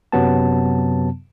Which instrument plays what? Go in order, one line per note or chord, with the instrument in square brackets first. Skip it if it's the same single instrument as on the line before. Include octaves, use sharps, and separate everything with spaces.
[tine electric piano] F#2 C3 F#3 B3 A5